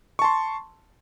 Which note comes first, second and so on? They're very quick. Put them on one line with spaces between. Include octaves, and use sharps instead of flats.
C#6 A5 C6